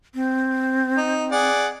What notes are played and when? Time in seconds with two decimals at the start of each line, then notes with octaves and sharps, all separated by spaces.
0.15 C4
0.97 D#4
1.32 G#4 D5 F#5